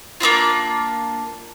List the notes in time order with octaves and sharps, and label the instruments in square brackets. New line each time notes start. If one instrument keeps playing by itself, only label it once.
[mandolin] A#3 C4 D4 F4